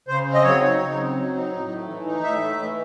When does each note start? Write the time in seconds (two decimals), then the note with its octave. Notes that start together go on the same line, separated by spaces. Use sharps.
0.08 C#3 C5
0.26 C4
0.34 D#5
0.44 F#3 C#5
0.61 D#4
0.79 C#3
0.98 C4
1.15 F#3
1.34 D#4
1.52 A2
1.70 A3
1.88 E3
2.05 D#4
2.23 A2 E5
2.42 A3
2.59 E3